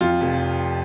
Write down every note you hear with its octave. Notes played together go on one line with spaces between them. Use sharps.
F2 F4
F1